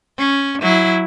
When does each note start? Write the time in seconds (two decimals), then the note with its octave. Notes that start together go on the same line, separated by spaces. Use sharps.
0.18 C#4
0.62 F#3 E4